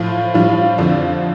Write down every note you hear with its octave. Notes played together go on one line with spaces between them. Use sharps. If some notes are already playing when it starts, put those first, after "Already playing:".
Already playing: A2 F3 F4
A2 F3 G3 F4
F2 D3 F3 D4